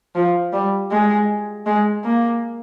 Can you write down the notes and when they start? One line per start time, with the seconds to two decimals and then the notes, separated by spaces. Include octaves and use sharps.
0.15 F3
0.53 G3
0.92 G#3
1.66 G#3
2.05 A#3